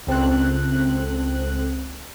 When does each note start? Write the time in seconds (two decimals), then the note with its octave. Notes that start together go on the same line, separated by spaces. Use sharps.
0.07 C#2 C4 A4 F#6